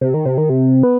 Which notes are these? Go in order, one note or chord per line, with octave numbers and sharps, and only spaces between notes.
C3
D#3
C3
D#3
C3
B3